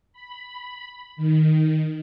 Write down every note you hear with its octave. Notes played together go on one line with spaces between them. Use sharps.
B5
D#3